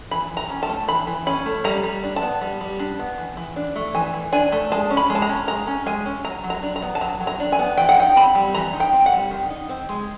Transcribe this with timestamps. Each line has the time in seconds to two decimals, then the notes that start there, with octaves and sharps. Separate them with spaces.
0.11 E3 B5
0.30 E3
0.37 A#5
0.50 C#4
0.63 A5
0.69 A3
0.88 E3 B5
1.07 E3
1.26 C#4 B5
1.46 A3
1.64 G3 A#5
1.83 G3
2.04 D4
2.16 A5
2.22 B3
2.41 G3
2.61 G3
2.79 D4
2.99 B3
3.18 E3
3.37 E3
3.56 D4
3.76 A3
3.95 E3 G#5
4.14 E3
4.33 D4 G#5
4.52 A3
4.72 G#3 A5
4.90 C#4
4.97 B5
5.10 G#3
5.15 A5
5.22 A#5
5.29 C#4
5.48 G#3 A#5
5.67 C#4
5.86 G#3 G#5
6.05 C#4
6.24 F#3 A#5
6.44 F#3
6.50 A#5
6.63 D4
6.76 A#5
6.82 B3
6.95 A5
7.01 F#3 A#5
7.20 F#3
7.27 A#5
7.40 D4
7.52 G#5
7.59 B3
7.78 E3 G5
7.89 F#5
7.97 D#4 G5
8.16 C4 B5
8.35 G3
8.55 E3 A#5
8.73 D#4
8.80 G5
8.93 C4
9.06 F#5
9.12 G3
9.31 D#3
9.50 D#4
9.69 C4
9.89 G#3